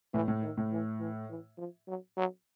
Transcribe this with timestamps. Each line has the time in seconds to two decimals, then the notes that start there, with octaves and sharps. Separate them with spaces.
0.14 A2 E3
0.28 A2
0.43 D#3
0.57 A2
0.72 E3
1.00 E3
1.30 E3
1.58 F3
1.88 F#3
2.17 F#3